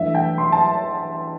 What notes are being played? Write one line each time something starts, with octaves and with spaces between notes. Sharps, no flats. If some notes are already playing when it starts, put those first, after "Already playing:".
Already playing: G2 E3 A3 E5
G5
C6
A5